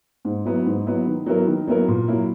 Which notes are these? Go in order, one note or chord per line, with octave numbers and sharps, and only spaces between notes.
G#2
F#3 B3 E4
G#2
F#3 B3 E4
D#3
F#3 B3 E4 A#4
D#3
F#3 B3 E4 A#4
A#2
F#3 A#3 E4